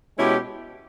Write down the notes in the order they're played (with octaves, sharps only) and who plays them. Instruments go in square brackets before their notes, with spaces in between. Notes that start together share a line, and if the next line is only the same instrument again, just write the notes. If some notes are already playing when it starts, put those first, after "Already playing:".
[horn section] B2 G#3 C#4 E4 G4